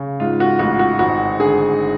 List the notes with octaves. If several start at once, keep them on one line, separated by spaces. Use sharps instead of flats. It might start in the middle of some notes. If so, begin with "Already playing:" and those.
Already playing: C#3
G#2 F4
F#4
A1 F#4
F#4
G#1 F#4
D3 G#4